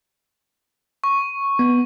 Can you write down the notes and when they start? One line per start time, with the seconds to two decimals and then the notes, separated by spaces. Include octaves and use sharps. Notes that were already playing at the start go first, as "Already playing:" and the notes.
1.04 C#6
1.59 B3